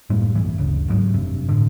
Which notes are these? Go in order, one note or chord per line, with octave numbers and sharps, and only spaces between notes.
F#2 A2 G3 A#3
B1 G2 E3
G1 D2 G2 C#3
G#2 E3 F#3
F1 G2 C3
A2 D3